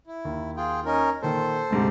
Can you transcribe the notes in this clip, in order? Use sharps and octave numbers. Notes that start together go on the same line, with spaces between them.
E4
D#2
F4 G#4 G5
C#4 D#4 A#4
A#2 D#3 A4 C5
D2 G#2 C3